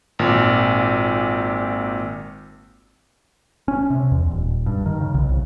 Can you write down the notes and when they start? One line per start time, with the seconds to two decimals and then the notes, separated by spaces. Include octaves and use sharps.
0.19 G#1 A#2
3.68 C#4
3.90 C3
4.12 E2
4.31 D#1
4.66 G2
4.86 D#3
5.01 C#3
5.14 B1
5.29 C2